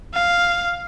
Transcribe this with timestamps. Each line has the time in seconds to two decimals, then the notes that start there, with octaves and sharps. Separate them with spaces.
0.14 F5